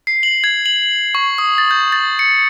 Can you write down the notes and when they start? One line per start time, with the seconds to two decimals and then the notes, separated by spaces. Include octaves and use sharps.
0.07 C7
0.23 F#7
0.44 G#6
0.66 F#7
1.15 C#6
1.38 D#6
1.58 A6
1.71 G6
1.92 A6
2.19 C#7